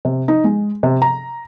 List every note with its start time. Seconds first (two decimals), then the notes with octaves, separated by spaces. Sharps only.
0.05 C3
0.28 D#4
0.44 G#3
0.83 C3
1.02 A#5